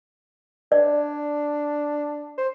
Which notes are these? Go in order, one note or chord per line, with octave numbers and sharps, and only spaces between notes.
D4 D5
C5